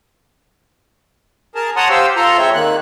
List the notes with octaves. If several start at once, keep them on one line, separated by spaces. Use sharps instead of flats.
G#4 A#4 A5
C#5 F#5 A5 A#5 C6 D#6
G4 C5 F5 G5 E6
F4 A4 A#5 C6
G#3 C4 C#5 E5
D#3 A#3 F#6